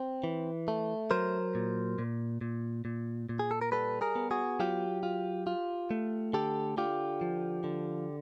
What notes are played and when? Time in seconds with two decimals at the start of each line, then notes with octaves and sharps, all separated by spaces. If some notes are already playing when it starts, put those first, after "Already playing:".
Already playing: C4
0.24 E3
0.68 A3
1.11 F#3 A#4 C5
1.55 A#2
1.99 A#2
2.41 A#2
2.85 A#2
3.29 A#2
3.39 G#4
3.51 A4
3.61 A#4
3.72 G3 A4 B4
4.01 G#4 A#4
4.15 B3
4.31 F#4 G#4
4.60 F#3 F4 G4
5.03 F4
5.47 F4
5.91 A3
6.33 D3 G4 A4
6.77 D3 F4 G4
7.21 F3
7.64 D3